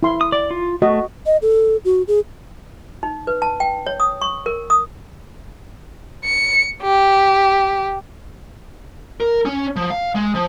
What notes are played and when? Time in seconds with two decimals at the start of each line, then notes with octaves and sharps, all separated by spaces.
0.03 E4 C6
0.21 D#6
0.32 D5 D6
0.51 F4
0.82 A3 F#4 D#5
1.26 D#5
1.42 A4
1.85 F#4
2.08 G#4
3.03 D#4
3.27 B4
3.42 A5
3.60 G5
3.87 C#5
4.00 D#6
4.21 C#6
4.46 A#4
4.70 D#6
6.24 C#7
6.82 G4
9.20 A#4
9.45 C#4
9.76 F3
9.90 F5
10.15 G#3
10.35 F3